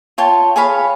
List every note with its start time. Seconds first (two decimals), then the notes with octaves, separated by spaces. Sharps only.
0.18 F4 C#5 G5 A5
0.56 G#4 C#5 F5 B5